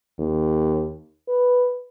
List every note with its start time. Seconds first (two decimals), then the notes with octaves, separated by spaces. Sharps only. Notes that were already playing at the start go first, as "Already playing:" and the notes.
0.19 D#2
1.28 B4